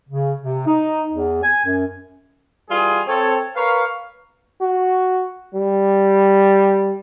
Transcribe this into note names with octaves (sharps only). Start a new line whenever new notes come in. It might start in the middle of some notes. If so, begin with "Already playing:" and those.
C#3
C3
D#4
E2
G#5
F#2
E3 G3 F4 G#4
C4 A4 C#5
A#4 B4 C#5 F5
F#4
G3